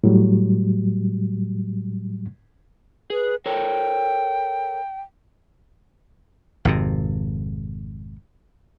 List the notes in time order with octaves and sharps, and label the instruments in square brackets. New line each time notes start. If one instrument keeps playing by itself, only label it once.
[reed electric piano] A2 F#3 G3
[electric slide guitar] G#4 [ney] B4
[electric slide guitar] A4 A#4 C#5 [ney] G5
[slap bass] G#1 F2 C3